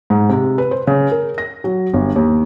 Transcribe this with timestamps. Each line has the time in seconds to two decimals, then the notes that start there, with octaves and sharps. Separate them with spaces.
0.10 G#2
0.29 C3
0.58 B4
0.71 C5
0.87 C#3
1.11 A#4
1.38 A#6
1.64 F#3
1.94 G1
2.16 D#2